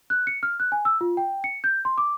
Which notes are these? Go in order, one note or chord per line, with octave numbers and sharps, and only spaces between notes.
F#6
C#7
F6
F#6
G#5
E6
F4
G5
C#7
G6
C6
D6